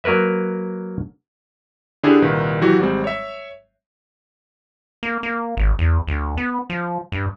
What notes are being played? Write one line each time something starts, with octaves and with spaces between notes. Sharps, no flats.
F#3 A#3 A#4 B4 E5
D3 D4 E4 G4 G#4
C2 A#2 D#3 B4
E3 F#3 E4 F#4 G4
G#1 G3 G#3 C4
C#5 E5
A#3
A#3
G#1
E2
D2
B3
F3
G2